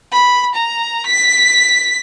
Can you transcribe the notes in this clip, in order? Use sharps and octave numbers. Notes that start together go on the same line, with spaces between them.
B5
A#5
B6